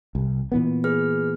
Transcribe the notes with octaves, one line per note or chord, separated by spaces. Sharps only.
C2
A#2 E3 B3
G#4 B4 F6